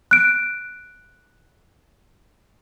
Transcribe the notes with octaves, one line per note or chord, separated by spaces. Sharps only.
F#6 D7